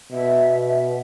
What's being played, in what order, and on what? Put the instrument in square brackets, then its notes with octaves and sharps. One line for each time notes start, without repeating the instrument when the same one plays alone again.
[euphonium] B2 [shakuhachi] E5